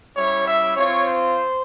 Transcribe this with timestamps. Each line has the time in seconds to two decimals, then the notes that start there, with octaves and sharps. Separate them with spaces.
0.15 G3 C#4 E4 C#5
0.46 E5
0.76 C4 F4 C#5
1.07 C5